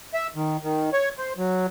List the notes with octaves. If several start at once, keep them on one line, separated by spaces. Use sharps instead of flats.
E5
D#3
D#3
C#5
C5
F#3